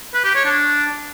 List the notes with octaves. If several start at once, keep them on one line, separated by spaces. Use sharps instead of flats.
B4
G4
C#5
D4